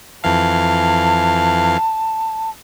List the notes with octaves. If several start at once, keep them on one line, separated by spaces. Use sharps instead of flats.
F2 E3 F5 A5